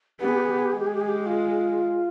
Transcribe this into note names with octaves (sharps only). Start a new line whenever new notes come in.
B3 G4
G#4
G4
G#4
G4
G#4
G4
G#3 G#4
G4
G#4
G4
G#4
G4
F4